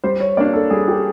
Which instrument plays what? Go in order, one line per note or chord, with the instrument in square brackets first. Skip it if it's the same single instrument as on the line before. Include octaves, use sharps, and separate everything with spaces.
[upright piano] G3 [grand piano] C5
[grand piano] C#5
[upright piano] A#3 D4 [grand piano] D5
[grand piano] A4
[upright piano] G3 [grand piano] G#4
[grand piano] G4